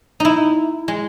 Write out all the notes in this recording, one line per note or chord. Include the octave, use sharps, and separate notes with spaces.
D#4 E4
G#3